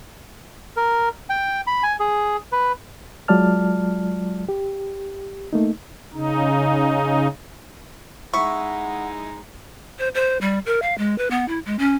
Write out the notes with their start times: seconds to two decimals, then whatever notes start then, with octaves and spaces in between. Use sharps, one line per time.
0.77 A#4
1.30 G5
1.67 B5
1.83 G#5
2.00 G#4
2.52 B4
3.28 F#3 G#3 F4 D5 A5 F6
4.49 G4
5.53 A3 A#3 D#4
6.13 C#3 D#4
8.34 G#3 D#4 E4 F#5 C#6
9.99 C5
10.15 C5
10.41 G3
10.66 A#4
10.82 F5
10.98 G#3
11.18 B4
11.31 B3
11.48 E4
11.66 G#3
11.79 C#4